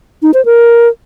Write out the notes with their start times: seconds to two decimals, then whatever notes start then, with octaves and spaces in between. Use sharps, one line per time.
0.22 D#4
0.34 C5
0.45 A#4